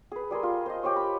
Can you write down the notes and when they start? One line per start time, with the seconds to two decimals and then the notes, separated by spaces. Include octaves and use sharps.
0.12 G#4 B4
0.31 G3 G#4 A#4 C6
0.43 F4
0.66 C5 D#5
0.83 G4 C5 C#5
0.96 B5